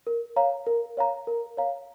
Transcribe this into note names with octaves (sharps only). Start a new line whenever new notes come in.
A#4
C#5 F5 A#5
A#4
C#5 F5 A#5
A#4
C#5 F5 A#5